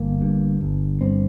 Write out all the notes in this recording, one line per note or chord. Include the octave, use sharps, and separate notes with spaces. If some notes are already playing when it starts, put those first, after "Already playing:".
Already playing: G1 A#3
G2
G1
G2 C4